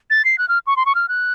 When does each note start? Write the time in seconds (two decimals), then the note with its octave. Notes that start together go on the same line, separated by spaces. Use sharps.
0.10 A6
0.25 C7
0.38 F#6
0.49 F6
0.67 C#6
0.76 C6
0.86 C#6
0.95 F6
1.09 F#6